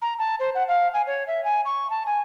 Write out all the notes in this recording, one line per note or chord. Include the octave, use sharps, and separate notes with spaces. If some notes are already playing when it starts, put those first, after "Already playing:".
A#5
A5
C5
F#5
F5
G#5
C#5
E5
G#5
C#6
A5
G#5